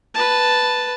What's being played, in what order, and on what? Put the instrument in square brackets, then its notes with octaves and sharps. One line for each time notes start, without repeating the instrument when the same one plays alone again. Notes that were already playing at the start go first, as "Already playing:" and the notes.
[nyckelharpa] B4 A5